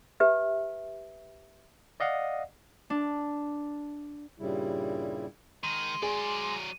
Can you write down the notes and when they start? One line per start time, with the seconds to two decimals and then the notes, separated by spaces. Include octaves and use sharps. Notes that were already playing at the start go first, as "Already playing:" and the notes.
0.20 G4 B4 E5
2.00 D5 D#5 F5 F#5
2.90 D4
4.38 G2 A#2 C#3 G3 E4
5.63 D#3 G#3 D#7
6.02 F#3 G#4 D5